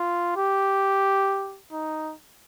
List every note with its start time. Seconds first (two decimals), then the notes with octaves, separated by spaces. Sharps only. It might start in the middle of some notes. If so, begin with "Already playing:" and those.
Already playing: F4
0.36 G4
1.72 D#4